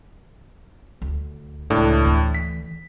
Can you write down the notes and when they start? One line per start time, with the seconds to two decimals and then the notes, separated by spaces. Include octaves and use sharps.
1.02 D2
1.70 C#2 A2 D4
2.04 D2 E3
2.35 B6